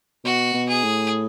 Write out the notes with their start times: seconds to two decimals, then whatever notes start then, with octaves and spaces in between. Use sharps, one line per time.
0.24 B2 F#4
0.54 B2
0.69 G#4
0.84 A2